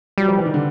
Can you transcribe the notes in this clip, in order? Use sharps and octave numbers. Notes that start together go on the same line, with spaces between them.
F#3 G3
F3
E3
D#3
D3